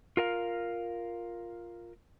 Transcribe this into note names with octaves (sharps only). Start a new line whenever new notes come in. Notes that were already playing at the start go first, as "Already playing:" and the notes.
F4 A#4 F5